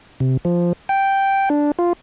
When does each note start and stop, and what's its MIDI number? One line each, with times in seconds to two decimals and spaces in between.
0.20 0.37 48
0.45 0.73 53
0.89 1.49 79
1.50 1.72 62
1.79 1.93 65